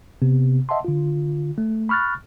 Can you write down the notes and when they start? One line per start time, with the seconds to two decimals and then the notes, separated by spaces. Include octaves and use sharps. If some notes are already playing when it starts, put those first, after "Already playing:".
0.22 C3 B3
0.69 D#5 E5 F#5 A5 C6
0.85 D3 F4
1.58 A3
1.89 B5 C#6 F6 F#6 A6